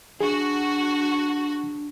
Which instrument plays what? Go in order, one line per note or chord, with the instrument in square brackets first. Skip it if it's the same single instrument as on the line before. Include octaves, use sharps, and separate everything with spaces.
[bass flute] D4 [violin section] F#4 [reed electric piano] G#4